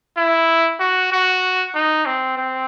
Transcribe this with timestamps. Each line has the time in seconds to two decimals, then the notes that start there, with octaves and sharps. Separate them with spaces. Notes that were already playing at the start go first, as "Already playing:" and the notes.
0.17 E4
0.80 F#4
1.12 F#4
1.75 D#4
2.06 C4
2.37 C4